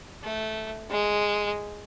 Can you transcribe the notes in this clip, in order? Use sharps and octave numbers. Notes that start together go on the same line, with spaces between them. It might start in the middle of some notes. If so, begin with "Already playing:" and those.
A3
G#3